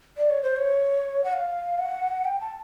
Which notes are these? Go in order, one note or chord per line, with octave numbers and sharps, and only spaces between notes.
D5
C#5
C5
C#5
F#5
F5
F#5
G5
A5